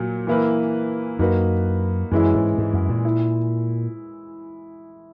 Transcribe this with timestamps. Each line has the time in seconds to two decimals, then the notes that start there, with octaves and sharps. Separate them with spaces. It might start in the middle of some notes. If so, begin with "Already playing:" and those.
Already playing: A#2 F#3
0.27 E3 A#3 E4 B4
1.19 F#2 A#3 D#4 F#4 B4
2.11 F#2 E3 G#3 C#4 E4
2.35 G#2
2.58 G#2
2.73 F#2
2.89 A#2
3.05 E4